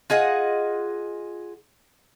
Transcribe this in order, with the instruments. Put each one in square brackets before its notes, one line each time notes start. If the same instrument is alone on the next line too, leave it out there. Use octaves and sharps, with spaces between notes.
[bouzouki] F4 G#4 D#5 F#5